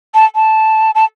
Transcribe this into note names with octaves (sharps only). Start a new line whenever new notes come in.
A5
A5
A5